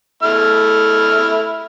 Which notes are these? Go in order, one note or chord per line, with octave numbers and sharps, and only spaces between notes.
A3 E4 F6